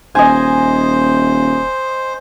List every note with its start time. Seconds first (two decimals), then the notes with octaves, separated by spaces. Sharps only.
0.15 D#1 C5 D#5 G#5